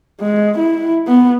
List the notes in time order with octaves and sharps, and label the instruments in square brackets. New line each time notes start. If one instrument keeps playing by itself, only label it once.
[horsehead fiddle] G#3
E4
B3